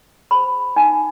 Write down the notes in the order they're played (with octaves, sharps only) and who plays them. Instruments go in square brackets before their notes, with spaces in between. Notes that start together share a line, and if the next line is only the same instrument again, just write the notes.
[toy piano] G#4 C5 B5
D#4 G#5